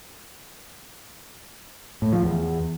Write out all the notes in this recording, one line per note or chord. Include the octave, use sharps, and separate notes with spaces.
A2
F3
E2